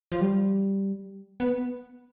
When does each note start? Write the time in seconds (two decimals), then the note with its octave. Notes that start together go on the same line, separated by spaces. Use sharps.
0.12 F3
0.21 G3
1.40 B3